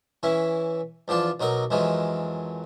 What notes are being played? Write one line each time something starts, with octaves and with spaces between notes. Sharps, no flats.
E3 C#4 E4
E2 F3 D4 F4 A5
B1 F#3 D#4 A#4 A#5
F2 D#3 E3 F#3 G#3